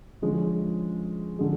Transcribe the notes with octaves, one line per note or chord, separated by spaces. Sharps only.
D3 F3 G#3 C#4
D3 F3 G#3